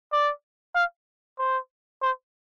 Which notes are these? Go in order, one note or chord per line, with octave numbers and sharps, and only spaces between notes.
D5
F5
C5
C5